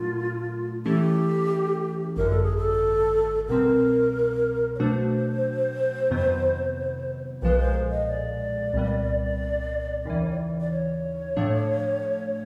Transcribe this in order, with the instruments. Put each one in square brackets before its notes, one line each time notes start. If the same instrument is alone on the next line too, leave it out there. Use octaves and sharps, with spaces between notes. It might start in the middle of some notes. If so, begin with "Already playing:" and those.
Already playing: [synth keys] A#2 F#3 A3 D4 [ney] F4
[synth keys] E3 A3 C#4 E4 A4 [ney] G4
[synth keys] G#1 F#2 D3 [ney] A#4
[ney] A4
G#4
A4
[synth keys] C2 B2 G3 C4 [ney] A#4
[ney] C#5
[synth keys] B2 F#3 A3 D4 F#4 [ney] C5
[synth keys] F2 C3 D#3 F#3 B3
[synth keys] B1 A#2 F3 G#3 [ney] B4
[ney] C5
D#5
D5
[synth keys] C2 A#2 G3 B3
D#2 C#3 E3
[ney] D5
C#5
[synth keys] A2 F3 A3 D4